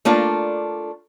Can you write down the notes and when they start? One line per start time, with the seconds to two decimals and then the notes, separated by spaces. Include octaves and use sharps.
0.05 A3 A#3 D4 F4